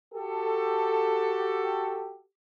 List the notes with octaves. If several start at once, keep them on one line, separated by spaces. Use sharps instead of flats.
F#4 G4 A4